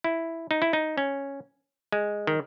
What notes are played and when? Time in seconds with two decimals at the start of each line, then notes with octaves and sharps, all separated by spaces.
0.04 E4
0.51 D#4
0.62 E4
0.73 D#4
0.98 C#4
1.92 G#3
2.27 D#3